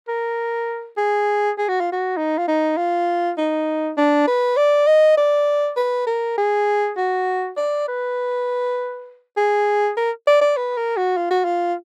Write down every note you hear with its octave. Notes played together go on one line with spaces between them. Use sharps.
A#4
G#4
G#4
F#4
F4
F#4
D#4
F4
D#4
F4
D#4
D4
B4
D5
D#5
D5
B4
A#4
G#4
F#4
D5
B4
G#4
A#4
D5
D5
B4
A#4
F#4
F4
F#4
F4